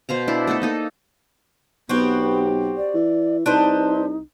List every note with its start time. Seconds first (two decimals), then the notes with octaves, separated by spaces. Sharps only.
0.09 B2 C5 F5 A#5
0.28 D4 E4
0.47 A3 B3 D#4 A4
0.62 A#3 D#4 A4
1.89 B1 B3 C4 F#4 G4
2.77 D5
2.94 E3
3.46 C2 D4 D#4 B4 C5